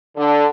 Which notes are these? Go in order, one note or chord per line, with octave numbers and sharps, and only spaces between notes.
D3